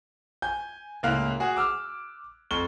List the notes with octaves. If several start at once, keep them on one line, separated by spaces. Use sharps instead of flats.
G#5 G6
C#2 A2 A#3 E4 F5 F#6
F#4 G#4
D6 E6 F6
F2 C#6 G7